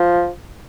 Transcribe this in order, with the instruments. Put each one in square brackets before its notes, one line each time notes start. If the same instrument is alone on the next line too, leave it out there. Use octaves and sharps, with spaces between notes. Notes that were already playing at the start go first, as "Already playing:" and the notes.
Already playing: [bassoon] F3